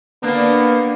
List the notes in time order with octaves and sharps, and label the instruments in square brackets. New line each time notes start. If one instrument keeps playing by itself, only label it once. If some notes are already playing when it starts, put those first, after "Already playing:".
[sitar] D3 D4 [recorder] A#3 [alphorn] B3